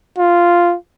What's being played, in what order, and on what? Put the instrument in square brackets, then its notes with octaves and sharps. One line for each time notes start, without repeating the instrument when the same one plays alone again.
[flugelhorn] F4